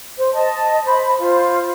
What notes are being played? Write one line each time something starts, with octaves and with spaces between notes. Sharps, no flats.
C5
D#5 A5
C5 B5
F4 C5